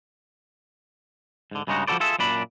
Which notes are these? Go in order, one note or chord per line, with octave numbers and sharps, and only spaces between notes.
G#2 D3
G2 C#3 G#3 D#4 F#4
F3 G3 F#4 A4 C5 D5
F4 G#4 A4 E5
F#2 A#2 D4 B5